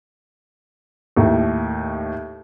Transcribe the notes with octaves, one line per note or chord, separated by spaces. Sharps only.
D#2 A2